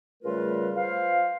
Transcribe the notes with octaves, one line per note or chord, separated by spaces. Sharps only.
C#3 G3 A3 F4 A#4 B4
F4 B4 C5 F5